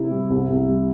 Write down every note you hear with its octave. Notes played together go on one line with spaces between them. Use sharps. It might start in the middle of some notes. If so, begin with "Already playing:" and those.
Already playing: C3 E4
G3
C2
C2
G3